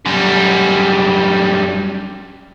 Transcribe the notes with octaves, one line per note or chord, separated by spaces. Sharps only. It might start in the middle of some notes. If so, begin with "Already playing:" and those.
F#2 G3